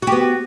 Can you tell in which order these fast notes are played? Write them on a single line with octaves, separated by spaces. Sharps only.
F#4 G4 B3